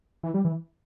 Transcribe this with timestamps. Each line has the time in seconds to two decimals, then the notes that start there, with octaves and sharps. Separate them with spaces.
0.23 E3
0.34 G3
0.45 E3